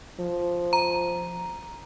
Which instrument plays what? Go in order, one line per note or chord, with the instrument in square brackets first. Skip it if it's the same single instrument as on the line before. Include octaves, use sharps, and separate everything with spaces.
[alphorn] F3
[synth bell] A#5